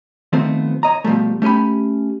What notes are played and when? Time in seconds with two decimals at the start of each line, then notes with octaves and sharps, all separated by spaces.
0.33 D#3 F3 A3 B3 C4 C5
0.83 C#5 D#5 A#5
1.04 B2 F3 G3 A3
1.42 A3 C#4 G4 G#5 B5